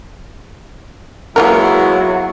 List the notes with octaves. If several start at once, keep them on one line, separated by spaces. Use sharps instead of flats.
F#3 G#3 A#3 B3 E4 F4 A#4